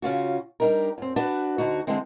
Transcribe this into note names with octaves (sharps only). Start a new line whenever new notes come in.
C#3 C#4 F4 F#4
G3 D4 D#4 G4 A#4
F#2 C4
D4 F#4 B4 D5
D2 D3 D#4 F#4
D3 E3 G#3 C4